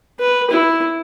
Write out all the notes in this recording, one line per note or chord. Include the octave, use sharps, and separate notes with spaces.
B4
E4